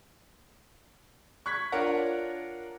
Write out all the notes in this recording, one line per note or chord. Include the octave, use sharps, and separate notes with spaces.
C#6 F#6 G#6 B6
D4 F4 A#4 C#5 F#5